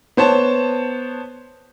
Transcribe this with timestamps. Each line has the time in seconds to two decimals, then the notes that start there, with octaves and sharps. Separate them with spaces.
0.17 B3 C5 C#5 A5